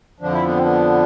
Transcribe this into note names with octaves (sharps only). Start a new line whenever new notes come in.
F2 D3 F3 D4
E4
B3 D4
C4
B3 D4